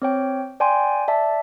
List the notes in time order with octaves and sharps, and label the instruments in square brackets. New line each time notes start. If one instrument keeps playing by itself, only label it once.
[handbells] C4 C#5 G5
D5 G5 G#5 C6
D5 E5 A5